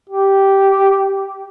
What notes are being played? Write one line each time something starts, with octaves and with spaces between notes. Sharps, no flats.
G4